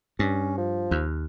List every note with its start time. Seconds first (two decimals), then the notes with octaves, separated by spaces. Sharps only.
0.19 G2 C#4
0.58 F3
0.91 D#2